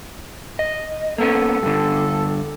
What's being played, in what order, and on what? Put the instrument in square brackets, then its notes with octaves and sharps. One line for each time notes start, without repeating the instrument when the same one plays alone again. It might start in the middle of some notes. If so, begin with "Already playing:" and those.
[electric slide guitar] D#5
[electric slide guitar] A#3 B3 C#4 [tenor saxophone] A4
[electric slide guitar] G2 D3